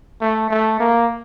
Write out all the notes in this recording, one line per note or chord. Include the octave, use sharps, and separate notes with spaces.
A3
A3
A#3